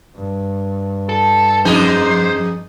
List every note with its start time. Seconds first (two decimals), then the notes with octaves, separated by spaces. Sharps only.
0.16 G2
1.09 A4
1.65 F2 D#4 G#4 C5